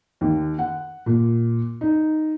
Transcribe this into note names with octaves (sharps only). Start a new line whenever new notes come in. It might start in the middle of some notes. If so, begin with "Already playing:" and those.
D#2
F#5
A#2
D#4